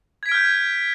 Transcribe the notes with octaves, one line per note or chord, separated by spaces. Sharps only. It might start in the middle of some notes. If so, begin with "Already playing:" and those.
F6 G6 G#6 B6 D7